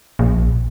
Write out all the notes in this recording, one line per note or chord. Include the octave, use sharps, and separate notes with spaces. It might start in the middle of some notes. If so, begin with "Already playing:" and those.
A#1